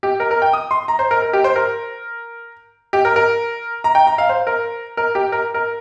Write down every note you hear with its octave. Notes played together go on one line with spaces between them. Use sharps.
G4
A#4
A#4
G5
D#6
C6
A#5
C5
A#4
A#4
G4
C5
A#4
G4
A#4
A#4
A#5
G5
A#5
F5
C5
A#4
A#4
G4
A#4
A#4